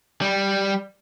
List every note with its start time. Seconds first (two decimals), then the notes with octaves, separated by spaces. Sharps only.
0.21 G3